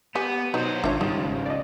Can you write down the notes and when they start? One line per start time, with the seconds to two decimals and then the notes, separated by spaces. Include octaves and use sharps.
0.15 B3 G4 G#5 G6
0.54 B2 F#3 B3 D#4 C5
0.84 G#1 D4 F4 C#5 E5
1.01 C#2 F3 G3 D#4
1.46 D5 D#5